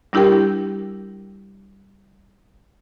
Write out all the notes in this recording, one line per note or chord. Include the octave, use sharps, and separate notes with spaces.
G3 D4 E4 G4 A#4 G5